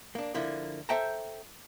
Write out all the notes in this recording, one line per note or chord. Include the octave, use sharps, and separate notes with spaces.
A#3 D4
D3 F3 A#3 E4
A4 C5 E5 G5 A5 A#5